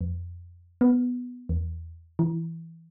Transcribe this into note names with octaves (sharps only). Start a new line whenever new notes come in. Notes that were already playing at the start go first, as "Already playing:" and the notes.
F2
B3
E2
E3